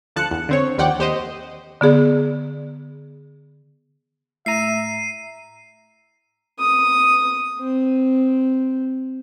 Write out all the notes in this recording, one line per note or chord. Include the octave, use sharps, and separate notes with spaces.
D2 F3 A5 F#6 C#7
E2
D3 C4 C#5
D#2 F3 D5 F#5 G5
D#2 G4 C5 D#5
D3 B3 G#4 D5
A2 E5 A#5 C7 D#7
D#6
C4